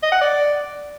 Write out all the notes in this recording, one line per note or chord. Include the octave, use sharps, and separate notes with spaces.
D#5
F#5
D5